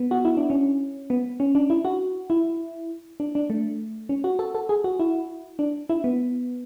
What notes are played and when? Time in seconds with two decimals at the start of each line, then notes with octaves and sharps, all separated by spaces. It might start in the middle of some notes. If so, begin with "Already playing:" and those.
Already playing: B3
0.11 F#4
0.25 E4
0.37 D4
0.50 C#4
1.10 B3
1.40 C#4
1.55 D4
1.70 E4
1.85 F#4
2.30 E4
3.20 D4
3.35 D4
3.50 A3
4.09 C#4
4.24 F#4
4.39 A4
4.55 A4
4.69 G#4
4.84 F#4
4.99 E4
5.59 D4
5.89 E4
6.04 B3